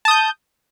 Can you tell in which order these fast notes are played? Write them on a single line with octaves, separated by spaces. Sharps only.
A5 D#6 G6